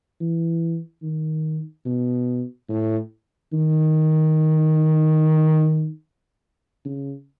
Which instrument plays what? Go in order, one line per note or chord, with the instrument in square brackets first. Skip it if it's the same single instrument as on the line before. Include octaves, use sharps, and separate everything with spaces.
[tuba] E3
D#3
B2
A2
D#3
C#3